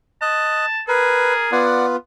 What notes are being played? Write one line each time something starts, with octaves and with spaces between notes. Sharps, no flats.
D#5 A5 F#6
G#4 A#4 B4
B3 F4 D5 F#5